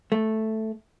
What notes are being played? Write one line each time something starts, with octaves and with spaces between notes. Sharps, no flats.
A3